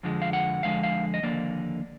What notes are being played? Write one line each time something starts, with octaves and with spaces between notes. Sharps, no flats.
F2 D3 F3 G#3
F5
F#5
F2 D3 F3 G#3 F5
F5
D#5
D#2 D3 F3 A#3 D5